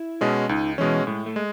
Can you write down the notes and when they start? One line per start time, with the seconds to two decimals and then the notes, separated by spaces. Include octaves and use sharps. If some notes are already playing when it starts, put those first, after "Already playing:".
Already playing: E4
0.21 B2 G#3 C#4
0.49 C#2 D#4
0.78 B2 E3 G#3 C#4
1.07 A2 G#3
1.26 A3
1.36 G#3